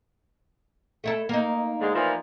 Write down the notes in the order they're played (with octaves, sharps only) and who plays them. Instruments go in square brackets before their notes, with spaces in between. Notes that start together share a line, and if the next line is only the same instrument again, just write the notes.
[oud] A3 E4 A4
A#3 D#4
[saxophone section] G#2 D3 G#3
A#2 E3 F3